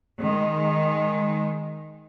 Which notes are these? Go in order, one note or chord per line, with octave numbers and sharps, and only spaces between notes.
D#3 G#3